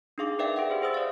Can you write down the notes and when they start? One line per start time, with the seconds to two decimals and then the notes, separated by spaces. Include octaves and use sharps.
0.18 D4 D#4 G#4 F5 D6
0.39 A#4 B4 D5 E5 F5 G5
0.56 G#4 E5 F#5
0.70 G4 C5
0.82 G#4 C5 D#6 E6 A6
0.94 D5 F5